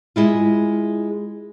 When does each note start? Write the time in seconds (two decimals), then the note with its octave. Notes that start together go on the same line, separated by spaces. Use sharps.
0.16 G#3 E4 F4